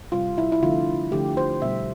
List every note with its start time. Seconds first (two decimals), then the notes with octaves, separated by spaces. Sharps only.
0.12 C3 G3 F4
0.38 E4
0.52 E4
0.62 D3 F3 A3 F4
1.12 D3 F3 A3 G4
1.37 C5
1.62 B2 G3 E5